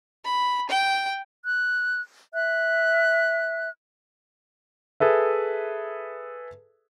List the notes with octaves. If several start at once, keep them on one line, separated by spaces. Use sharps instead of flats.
B5
G5
F#6
E5 F#6
G#4 A4 B4 E5